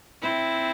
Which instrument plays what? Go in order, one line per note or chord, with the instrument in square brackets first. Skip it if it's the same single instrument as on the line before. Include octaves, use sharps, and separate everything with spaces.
[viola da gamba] C4 E4